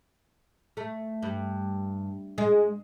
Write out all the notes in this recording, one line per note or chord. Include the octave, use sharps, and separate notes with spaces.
A3
G2
G#3